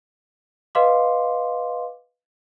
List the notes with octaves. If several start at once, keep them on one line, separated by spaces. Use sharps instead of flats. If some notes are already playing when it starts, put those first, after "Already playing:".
B4 D#5 F5 C6 D6